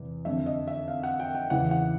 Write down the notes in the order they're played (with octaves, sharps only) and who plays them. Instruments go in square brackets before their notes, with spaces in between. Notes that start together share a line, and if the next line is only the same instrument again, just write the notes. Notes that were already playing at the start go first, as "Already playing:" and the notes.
Already playing: [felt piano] E2 C3
F2 D3 E5
D#5
E5
F5
F#5
G5
G5
E2 C#3 E3 F#5
F#5